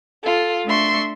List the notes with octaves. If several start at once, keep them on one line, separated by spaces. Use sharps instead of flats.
F4 A4
A3 D4 E5 C6 C#6